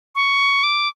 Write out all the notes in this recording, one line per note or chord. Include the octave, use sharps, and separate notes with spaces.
C#6
D6